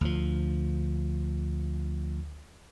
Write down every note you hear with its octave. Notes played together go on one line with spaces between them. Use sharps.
D2 F3